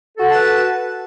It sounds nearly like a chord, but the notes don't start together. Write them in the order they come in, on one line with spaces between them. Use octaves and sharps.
A4 F#4 F#5 A5 B4